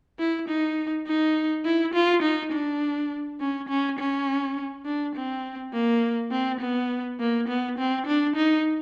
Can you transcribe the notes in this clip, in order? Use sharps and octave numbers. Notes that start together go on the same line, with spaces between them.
E4
D#4
D#4
E4
F4
D#4
D4
C#4
C#4
C#4
D4
C4
A#3
C4
B3
A#3
B3
C4
D4
D#4